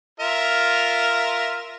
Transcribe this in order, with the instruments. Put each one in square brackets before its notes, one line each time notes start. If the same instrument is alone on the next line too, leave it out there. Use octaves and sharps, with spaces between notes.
[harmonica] F4 A#4 E5